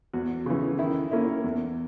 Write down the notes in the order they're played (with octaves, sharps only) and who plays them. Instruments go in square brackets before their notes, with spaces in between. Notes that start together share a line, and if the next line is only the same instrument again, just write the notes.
[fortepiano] E2 F#4
C#3 E3
D#3 E4
A#3 C#4 E4
E2